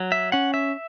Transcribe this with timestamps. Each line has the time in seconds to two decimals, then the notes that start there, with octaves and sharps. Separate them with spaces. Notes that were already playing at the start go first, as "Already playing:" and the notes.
Already playing: F#3
0.12 E5
0.32 C#4 F#5
0.54 E5